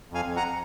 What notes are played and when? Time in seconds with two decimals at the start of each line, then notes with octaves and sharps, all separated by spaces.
0.10 F2 F5 G#5
0.25 F2
0.36 F#5 A#5